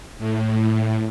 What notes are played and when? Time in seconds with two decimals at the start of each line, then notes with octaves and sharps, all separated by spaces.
0.18 A2